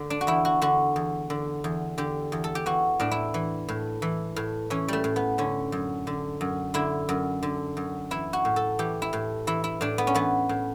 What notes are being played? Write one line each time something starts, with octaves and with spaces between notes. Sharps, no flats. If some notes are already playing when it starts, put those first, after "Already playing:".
Already playing: D3
D4
F#4
E2 E4
F#4
D3 F#4
E2
D3
E2
D3 G4
E2
A4
G4
E3 F#4
A2 D4
E4
E3
A2
E3
A2
E3 C#4
G3 A3
A2
B3
D3 C#4
F#2
D3
F#2
D3 E4
F#2
D3
F#2
E3 E4
F#4
A2
A4
E3 G4
E4
A2
E3 E4
E4
A2 D4
B3
C#4
E3 B3
A2